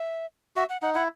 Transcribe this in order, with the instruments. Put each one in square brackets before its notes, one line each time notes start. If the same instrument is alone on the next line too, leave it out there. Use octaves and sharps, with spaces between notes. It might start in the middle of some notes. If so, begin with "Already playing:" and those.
Already playing: [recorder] E5
[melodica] F#4 [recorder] E5
[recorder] F#5
[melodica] D#4 [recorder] F#5
[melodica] E4 [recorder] F#5